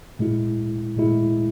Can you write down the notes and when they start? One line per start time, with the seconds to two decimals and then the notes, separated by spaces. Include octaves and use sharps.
0.19 A#2 G#3 E4
0.96 A#2 G#3 E4